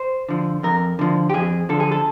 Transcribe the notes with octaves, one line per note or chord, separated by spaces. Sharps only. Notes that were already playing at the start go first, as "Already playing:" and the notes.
Already playing: C5
D3 F3
F2 A#4
D3 F3
G4
F2 G#4
D3 F3 A4
G#4
A4